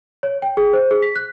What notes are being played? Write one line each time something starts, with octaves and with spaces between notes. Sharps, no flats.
C#5
G5
G#4
C5
G#4
B6
F#6